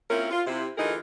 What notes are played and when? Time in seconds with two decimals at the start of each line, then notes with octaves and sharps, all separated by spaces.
0.09 A#3 C4 C#4 E4 F4 A#4
0.31 F4
0.46 C3 E4
0.77 D2 E3 D#4 F4 G#4 A#4